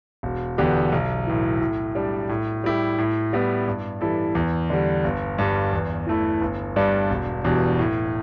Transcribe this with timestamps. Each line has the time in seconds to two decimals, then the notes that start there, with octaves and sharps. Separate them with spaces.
0.23 E1
0.58 E2 D3 B3 G4
0.92 B1
1.27 A2 E3
1.61 A2
1.95 G3 D4
2.29 A2
2.64 G3 E4 G4
2.98 A2
3.33 G3 B3 E4
3.67 G2
4.01 E3 G3 E4 A4
4.35 E2
4.70 D3 G3
5.04 G1
5.38 G2 G3
5.73 E2
6.07 E3 A3 E4
6.41 G1
6.76 G2 G3 D4
7.10 E1
7.44 E2 B2 G3 D4
7.79 A2